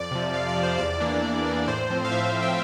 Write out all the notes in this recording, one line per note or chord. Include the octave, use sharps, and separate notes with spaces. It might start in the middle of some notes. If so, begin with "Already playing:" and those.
Already playing: F2 D5
C3 F3
F2 F5
D5
C3 F3
C5
E2 D5
E3 A#3 D4
E2
E3 A#3 D4
A2 C5
F3 C4
F5
A2 E5
F5
F3 C4
G5